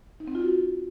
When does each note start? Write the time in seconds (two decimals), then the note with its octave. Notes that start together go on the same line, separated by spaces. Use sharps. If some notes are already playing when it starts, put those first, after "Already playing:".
0.20 D#4
0.28 C4
0.35 F4
0.42 F#4